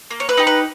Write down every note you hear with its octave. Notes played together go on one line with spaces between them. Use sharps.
A#3
C#5
B4
D#4 G4
B4